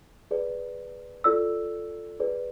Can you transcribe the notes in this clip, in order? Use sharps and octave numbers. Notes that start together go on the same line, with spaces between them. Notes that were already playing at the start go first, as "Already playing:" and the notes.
G#4 B4 D5
F4 A4 D5 E6
G#4 B4 D5